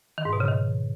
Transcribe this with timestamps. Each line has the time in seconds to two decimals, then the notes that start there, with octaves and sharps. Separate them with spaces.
0.18 D#3
0.25 G#2
0.33 B2
0.40 C#3
0.48 D#3